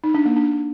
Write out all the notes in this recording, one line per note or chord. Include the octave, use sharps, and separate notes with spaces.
D#4
D4
A#3
D4